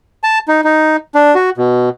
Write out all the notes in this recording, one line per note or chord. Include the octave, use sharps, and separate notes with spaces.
A5
D#4
D#4
D4
F#4
B2